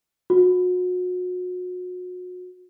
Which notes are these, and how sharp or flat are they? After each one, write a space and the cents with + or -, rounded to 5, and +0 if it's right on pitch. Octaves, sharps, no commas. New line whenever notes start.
F#4 -35